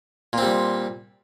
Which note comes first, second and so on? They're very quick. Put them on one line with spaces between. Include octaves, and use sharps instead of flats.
A#2 C4 G3